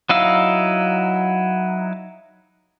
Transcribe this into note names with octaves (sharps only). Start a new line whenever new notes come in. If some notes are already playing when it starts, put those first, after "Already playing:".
F#3 D#4 E4 F5 E6